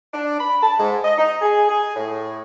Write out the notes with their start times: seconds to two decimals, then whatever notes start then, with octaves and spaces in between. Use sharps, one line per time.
0.13 D4
0.39 B5
0.63 A5
0.79 G#2
1.04 D#5
1.18 D#4
1.42 G#4
1.69 G#4
1.96 A2